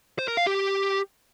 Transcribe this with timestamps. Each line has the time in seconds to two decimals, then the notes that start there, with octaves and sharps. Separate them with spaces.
0.19 C5
0.28 A#4
0.37 F5
0.47 G4